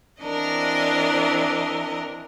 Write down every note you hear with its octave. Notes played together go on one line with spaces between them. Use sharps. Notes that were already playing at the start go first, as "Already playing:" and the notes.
E3 C4 D4 A#4 D#5